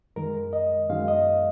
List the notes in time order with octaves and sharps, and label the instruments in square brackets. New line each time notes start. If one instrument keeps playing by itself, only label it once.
[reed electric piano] F#2 D#3 G#3 A#4
D#5
F#2 D#3 G#3 F5
D#5